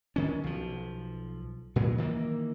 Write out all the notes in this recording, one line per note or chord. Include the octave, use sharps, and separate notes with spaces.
D#3 C#4
B1 F3
A#2 F#3
D#3 E3 G#3 A#3